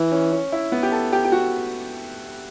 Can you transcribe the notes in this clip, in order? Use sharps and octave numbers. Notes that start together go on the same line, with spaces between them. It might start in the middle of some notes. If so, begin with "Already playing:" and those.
Already playing: E3
C#4
C#4
E4
B3
G4
A4
G4
G4
F#4